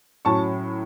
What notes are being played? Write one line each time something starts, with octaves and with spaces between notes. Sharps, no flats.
A2 F#3 C#4 A5 C#6